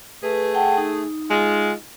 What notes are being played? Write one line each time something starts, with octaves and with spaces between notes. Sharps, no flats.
A3 G#4 B4
F#5 G5 A5
D#4
G#3 F4